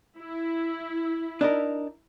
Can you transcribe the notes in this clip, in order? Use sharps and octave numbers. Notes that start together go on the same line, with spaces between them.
E4
D4 D#4 A#4